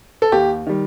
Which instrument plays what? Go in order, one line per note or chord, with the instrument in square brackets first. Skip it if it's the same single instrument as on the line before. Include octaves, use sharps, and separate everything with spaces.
[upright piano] A4
D#2 G4
D#3 G3